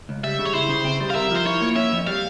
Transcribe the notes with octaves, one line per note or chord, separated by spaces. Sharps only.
C#2
G3 E5
C#3
C#5
E4 C5
C#3
C4
G3
F5
A#4 E5
F3 C5
E4 C#5
A#3
C#4 E5
F2
G3 F5